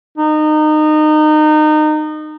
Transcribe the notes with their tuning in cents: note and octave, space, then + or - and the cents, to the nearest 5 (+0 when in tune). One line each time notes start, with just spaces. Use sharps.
D#4 -25